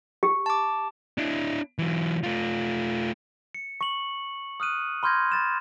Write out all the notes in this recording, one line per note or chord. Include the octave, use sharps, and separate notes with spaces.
G4
A5 D6
D4 E4
E3 F#3
A3 F4
C#7
C#6 F#7
D#6 F6 F#6 D#7
B5 C6 F6 G6 G#6 A#6
B5 A6 E7